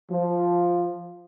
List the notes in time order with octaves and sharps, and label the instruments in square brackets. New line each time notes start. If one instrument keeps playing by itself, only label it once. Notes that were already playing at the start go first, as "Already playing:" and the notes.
[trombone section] F3